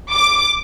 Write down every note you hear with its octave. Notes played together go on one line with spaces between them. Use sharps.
D6